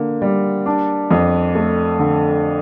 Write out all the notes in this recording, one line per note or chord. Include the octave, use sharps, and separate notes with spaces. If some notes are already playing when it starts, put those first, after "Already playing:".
Already playing: D3 A#3
G3
D4
F2
A3
D3